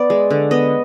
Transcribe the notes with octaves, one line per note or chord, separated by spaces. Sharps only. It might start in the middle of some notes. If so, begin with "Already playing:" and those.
Already playing: B3 D5
G#3
D3
B3 D#5